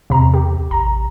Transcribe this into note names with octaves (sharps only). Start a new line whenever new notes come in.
E2 C3 A#5
G4
A1 A#5